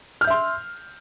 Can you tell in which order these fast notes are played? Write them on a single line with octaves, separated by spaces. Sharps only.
F6 G6 E5 C6